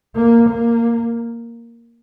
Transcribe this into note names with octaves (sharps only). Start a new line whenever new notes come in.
A#3
A#3